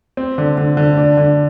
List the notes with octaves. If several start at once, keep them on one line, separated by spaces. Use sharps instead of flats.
C4
D3
D3
D3
D4
D3